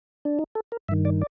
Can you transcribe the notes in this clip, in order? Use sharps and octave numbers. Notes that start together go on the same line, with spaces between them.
D4
D#4
A4
A#4
G2 D#3 E5
D5
D5